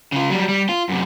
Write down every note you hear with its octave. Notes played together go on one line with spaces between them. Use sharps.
C#3 F4
F#3 G3
G3
F4
F#2 C3